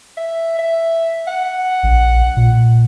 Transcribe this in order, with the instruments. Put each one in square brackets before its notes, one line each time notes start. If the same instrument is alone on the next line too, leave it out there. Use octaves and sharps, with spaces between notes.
[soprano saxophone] E5
E5
F#5
[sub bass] A#1
A#2